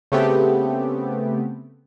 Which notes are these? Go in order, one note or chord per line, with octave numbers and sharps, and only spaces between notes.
C#3 A3 B3 C4 G4